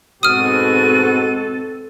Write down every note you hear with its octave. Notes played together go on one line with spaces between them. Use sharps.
G#2 B2 C4 F#4 A4 D#6 F6 D#7